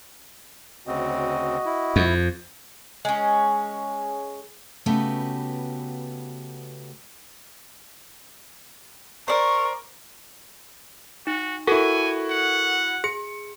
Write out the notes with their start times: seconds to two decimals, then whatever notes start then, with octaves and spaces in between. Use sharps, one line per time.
0.87 D2 C#3 C4 F#4 D#5
1.66 E4
1.96 F2
3.05 G#3 C#4
4.86 C#3 A3 B3 F#4 G4 B4
9.28 A#4 C5 D5 C#6
11.27 D#4 F#4
11.67 E4 F#4 A4 A#4 G#5
12.30 F#5
13.04 G#4 C#7